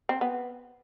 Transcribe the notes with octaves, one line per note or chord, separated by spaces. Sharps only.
C4
B3